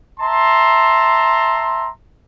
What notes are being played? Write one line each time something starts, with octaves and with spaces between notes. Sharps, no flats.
E5 A5 A#5 C6